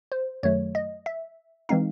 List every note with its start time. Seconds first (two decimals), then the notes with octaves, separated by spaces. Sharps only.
0.12 C5
0.43 F#2 D#3 F#3 A3 C#5
0.75 D#5
1.06 E5
1.69 E3 G#3 C4 D#4 F5